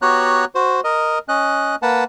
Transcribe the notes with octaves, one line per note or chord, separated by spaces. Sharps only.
B3 F#4 G4 C#5 A#5 F#6
F#4 C5
A#4 D#5
C#4 D#5 F#6
A#3 B4 F#5 A5